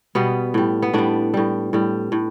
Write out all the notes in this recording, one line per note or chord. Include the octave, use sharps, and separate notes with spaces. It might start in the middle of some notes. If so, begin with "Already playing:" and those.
B2 G3 B3
A2 G3
B3
A2 G3 D4
A2 G3
A2 G3
A2